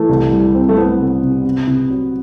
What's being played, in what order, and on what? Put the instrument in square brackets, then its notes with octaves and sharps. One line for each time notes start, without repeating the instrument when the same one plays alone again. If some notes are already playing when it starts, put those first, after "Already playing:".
Already playing: [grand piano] E3 [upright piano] A3
[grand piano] C2
G3
C4
[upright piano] A3
[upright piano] B3 [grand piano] C4
[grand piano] C3
C3
C3
C3
F#3